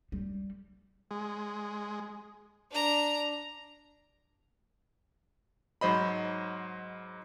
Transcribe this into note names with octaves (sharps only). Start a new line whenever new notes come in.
G3
G#3
D4 A#5
G#2 F#3 C5 D#5 B5